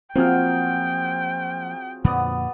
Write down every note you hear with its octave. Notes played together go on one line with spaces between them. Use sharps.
F3 F#3 A#3 C4 F4 G#4 F5 G5
F2 A#2 D3 B3 D5 D#6